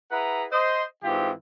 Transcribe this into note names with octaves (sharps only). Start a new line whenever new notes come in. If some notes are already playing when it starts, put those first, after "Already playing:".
E4 G#4 B4 F#5 A#5
C5 D#5
G#2 E3 C4 F4 G4